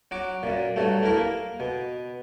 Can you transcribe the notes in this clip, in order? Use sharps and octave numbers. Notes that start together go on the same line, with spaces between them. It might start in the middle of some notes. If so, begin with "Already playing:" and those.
F#3 F#4 D6
F#2 A#2
G2 F#3 A3
A3 E4 A#4
A#3
B2